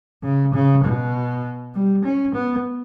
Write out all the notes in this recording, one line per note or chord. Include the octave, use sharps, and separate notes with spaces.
C#3
C#3
B2
G3
C#4
B3